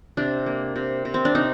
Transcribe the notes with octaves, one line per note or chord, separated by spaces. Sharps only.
C3 D4
A#3
C3
C3
C4
D4
C3 D#4